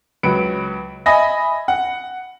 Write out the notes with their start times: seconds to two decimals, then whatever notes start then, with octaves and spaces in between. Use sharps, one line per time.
0.23 C#2 F#3 B4 D7
1.06 D#5 E5 G#5 B5 A#6
1.68 F#5